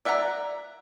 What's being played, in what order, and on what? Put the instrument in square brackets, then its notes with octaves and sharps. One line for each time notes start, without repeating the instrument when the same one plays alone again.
[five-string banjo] D5 E5 F#5 G5 A#5